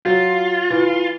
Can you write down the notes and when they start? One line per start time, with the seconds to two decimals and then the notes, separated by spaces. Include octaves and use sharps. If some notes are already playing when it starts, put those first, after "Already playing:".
0.06 F#3 F4
0.70 E3